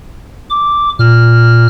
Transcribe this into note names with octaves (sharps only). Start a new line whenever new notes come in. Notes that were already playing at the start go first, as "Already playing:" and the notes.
D6
A#2 F6